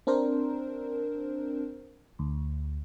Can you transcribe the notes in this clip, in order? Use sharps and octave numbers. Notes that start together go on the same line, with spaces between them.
C4 D4 A#4 C5
D2